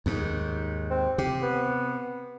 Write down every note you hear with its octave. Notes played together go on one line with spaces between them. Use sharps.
D#2 G#2
C4
C3 G4
B3